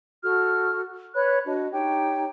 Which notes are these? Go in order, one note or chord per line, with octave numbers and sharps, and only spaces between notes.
F#4 A4 F6
B4 C#5 B5 F#6
D4 F#4 D#5
D#4 G4 C#5 G5